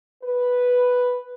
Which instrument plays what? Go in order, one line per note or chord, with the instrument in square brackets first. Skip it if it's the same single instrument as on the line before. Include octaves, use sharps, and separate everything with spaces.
[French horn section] B4